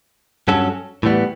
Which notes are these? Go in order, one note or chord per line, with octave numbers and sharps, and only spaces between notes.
G2 F#3 C#4 F#4 A4
A2 E3 G3 B3